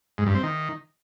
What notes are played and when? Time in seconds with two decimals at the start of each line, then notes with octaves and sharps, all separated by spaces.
0.18 G#2
0.26 G2
0.35 C4
0.43 D#3